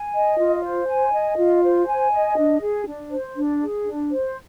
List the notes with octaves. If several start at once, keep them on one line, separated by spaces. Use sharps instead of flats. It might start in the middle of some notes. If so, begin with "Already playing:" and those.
Already playing: G#5
D#5
F4
C5
G#5
D#5
F4
C5
G#5
D#5
D4
G#4
D4
C5
D4
G#4
D4
C5